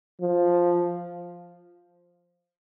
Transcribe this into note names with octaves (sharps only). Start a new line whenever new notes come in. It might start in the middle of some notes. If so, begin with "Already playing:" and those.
F3